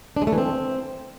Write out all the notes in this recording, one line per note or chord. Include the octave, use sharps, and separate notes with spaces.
D4
G#3
A3
E3
C4